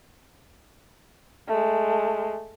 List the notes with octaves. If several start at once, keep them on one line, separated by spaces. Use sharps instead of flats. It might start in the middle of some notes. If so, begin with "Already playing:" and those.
G#3 A3